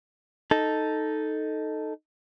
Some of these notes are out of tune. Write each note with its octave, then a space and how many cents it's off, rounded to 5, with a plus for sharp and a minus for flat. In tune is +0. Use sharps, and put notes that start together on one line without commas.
D#4 +0 A4 +0